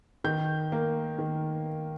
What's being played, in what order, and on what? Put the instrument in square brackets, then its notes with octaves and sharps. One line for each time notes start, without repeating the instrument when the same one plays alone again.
[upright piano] D#3 G6
A#3
D#3